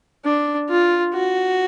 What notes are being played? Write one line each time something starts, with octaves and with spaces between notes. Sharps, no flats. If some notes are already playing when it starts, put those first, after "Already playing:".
D4
F4
F#4